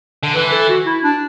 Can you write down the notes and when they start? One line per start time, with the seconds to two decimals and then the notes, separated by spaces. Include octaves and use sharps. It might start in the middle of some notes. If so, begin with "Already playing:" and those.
0.23 D3
0.35 E3 B4
0.52 A4
0.69 F#4
0.86 E4
1.04 D4